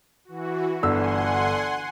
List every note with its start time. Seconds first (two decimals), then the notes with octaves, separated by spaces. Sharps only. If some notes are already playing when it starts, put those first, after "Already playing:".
0.25 E3 F#4
0.83 G1 D3 F#5 G#5 C6 E6